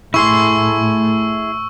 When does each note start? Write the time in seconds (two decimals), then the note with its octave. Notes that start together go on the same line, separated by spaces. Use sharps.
0.14 A2 A3 E4 G#4 C6 C#6 E6